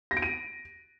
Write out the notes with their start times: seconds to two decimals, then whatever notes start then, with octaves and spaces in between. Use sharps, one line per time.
0.11 A#6
0.17 D7
0.22 D#7